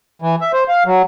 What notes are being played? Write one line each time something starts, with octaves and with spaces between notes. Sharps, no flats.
E3
E5
C5
F5
F#3